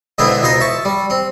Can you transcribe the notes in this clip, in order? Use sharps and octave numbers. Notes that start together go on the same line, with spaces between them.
G#2 B2 D3 B3 C4 E4
C#2 B2 D#4 C5 A#5
E5 A5 C#6
G3
C4